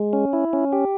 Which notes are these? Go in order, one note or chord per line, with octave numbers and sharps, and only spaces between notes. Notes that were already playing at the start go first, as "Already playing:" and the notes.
Already playing: G#3
C#4
E4
C#4
G4